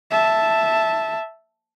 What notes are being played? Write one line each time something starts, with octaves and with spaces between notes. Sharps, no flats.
E5 A5